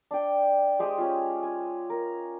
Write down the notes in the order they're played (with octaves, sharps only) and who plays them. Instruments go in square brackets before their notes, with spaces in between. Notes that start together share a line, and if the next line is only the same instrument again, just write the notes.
[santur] D4 G5
G#3 G4 C5 D#6
C#4 F4
G#5
A#4